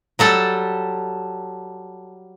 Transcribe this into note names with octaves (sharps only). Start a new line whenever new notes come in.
F#3 G3 A4